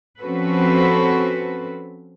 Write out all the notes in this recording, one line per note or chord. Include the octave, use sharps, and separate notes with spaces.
F3 C4 C#4 F#4 A4 B4